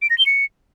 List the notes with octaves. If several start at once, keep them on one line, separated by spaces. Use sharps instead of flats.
D7
A#6
G7
C#7